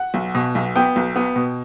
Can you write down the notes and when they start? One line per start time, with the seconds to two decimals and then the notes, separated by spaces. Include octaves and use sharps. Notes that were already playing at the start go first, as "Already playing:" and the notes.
Already playing: F#5
0.14 B1
0.35 B2
0.55 B1
0.76 B3 G5
0.96 B1
1.16 B3
1.36 B2